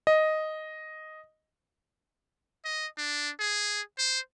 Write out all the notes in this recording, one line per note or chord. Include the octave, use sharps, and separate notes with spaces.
D#5
D#5
D4
G#4
C5